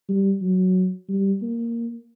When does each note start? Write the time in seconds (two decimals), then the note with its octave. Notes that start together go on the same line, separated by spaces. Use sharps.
0.09 G3
0.42 F#3
1.09 G3
1.42 A#3